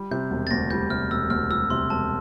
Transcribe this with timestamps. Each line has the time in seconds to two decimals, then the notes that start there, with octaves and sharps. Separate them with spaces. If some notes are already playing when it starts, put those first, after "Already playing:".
Already playing: G3
0.11 C3 G6
0.31 E1
0.47 A6
0.51 D2 A#6
0.71 G3 G6
0.90 C3 F6
1.11 E1 E6
1.30 D2 F6
1.50 G3 E6
1.70 C3 C6
1.90 E1 A5